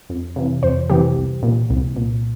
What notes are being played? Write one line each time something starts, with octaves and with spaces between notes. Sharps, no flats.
F2
C3 E3
F2 C5
C3 E3 G4
C2
A#2
C2
A#2